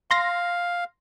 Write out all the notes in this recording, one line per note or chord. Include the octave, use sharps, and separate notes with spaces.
F5 C6 A#6